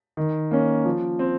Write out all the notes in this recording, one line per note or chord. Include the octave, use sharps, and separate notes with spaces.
D#3
A#3 C#4
F3
C4